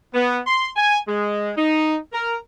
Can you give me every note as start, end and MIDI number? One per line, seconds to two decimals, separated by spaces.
0.14 0.38 59
0.46 0.69 84
0.76 0.97 80
1.07 1.51 56
1.56 1.96 63
2.12 2.36 70